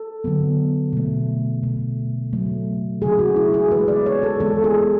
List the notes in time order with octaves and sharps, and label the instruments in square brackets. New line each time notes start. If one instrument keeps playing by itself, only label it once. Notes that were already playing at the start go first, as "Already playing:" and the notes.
Already playing: [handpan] A4
D3 F#3 B3
B2 A3
B2 A3
C#3 F#3 A3
C#3 F#3 A3 G#4
F#4
E4
G#4
E3 G#3 B3 B4
D5
C#5
A4
E3 G#3 B3 A4
G#4